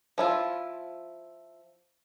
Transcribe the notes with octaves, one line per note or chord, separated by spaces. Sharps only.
F3 E4 F4